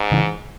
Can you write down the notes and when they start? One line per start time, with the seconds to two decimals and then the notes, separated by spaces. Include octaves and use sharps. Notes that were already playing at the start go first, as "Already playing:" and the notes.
Already playing: G#2
0.12 C#3 E3